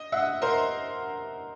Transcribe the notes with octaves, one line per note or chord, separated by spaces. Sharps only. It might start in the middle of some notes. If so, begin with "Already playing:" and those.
Already playing: D#5
E5 F#5
A#4 C5